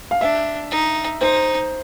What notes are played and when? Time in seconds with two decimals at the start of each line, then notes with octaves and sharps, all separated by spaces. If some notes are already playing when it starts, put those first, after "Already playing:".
0.11 F5
0.21 D4 E5
0.71 D#4
1.20 D#4 C5